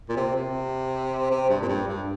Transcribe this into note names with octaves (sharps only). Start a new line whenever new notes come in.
A#2
C3
C3
C3
G2
A#2
G2
G2